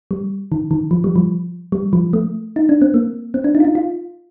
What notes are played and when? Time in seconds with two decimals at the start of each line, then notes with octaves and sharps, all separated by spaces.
0.11 G3
0.52 D#3
0.71 D#3
0.91 F3
1.04 G3
1.16 F3
1.72 G3
1.93 F3
2.13 A3
2.56 D#4
2.69 D4
2.82 C4
2.94 A#3
3.34 C4
3.44 D4
3.55 D#4
3.60 F4
3.65 D#4
3.75 F4